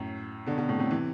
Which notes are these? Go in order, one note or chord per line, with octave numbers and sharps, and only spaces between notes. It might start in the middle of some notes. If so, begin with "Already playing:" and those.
Already playing: F#2 A2
B2 D3
B2 D3
A2 C3
A2 C3
C3 E3